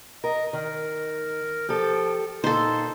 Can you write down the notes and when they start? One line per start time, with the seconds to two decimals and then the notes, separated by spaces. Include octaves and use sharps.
0.24 A#4 D#5
0.53 D#3 A#4
1.69 F3 G4 A4
2.44 A#2 D#4 A4 C5 C6